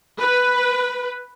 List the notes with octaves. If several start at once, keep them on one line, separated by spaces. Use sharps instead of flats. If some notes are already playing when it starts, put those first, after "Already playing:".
B4